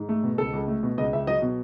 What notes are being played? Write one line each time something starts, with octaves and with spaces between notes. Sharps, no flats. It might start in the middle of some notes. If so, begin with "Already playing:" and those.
Already playing: G#2
A3
B2
C#2 A4
C#2
A3
B2
C#2 D#5
C#2 E5
F#3 D#5
B2